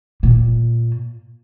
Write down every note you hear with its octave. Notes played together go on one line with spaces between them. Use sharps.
A#2